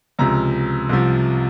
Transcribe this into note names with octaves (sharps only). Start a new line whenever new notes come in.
C#2 C3 F3 A#5
C2 C3 F3